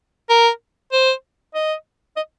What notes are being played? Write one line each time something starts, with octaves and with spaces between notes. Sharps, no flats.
A#4
C5
D#5
D#5